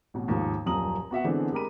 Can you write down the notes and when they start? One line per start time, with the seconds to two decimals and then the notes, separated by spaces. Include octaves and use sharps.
0.14 A1 B2
0.28 D#2 G#2 F3 A#3
0.66 D#1 F#2 F3 A#5 D#6 F#7
1.11 B3 F#4 E5 F#5
1.24 D3 E3 G#3 B3 C4 D4
1.52 G#3 G4 A#4 B5 D#7